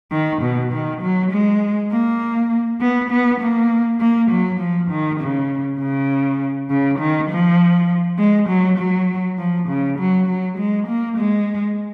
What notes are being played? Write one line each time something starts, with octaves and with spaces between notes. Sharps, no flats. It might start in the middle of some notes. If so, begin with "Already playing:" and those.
D#3
B2
D#3
F#3
G#3
A#3
B3
B3
A#3
A#3
F#3
F3
D#3
C#3
C#3
C#3
D#3
F3
G#3
F#3
F#3
F3
C#3
F#3
F#3
G#3
A#3
G#3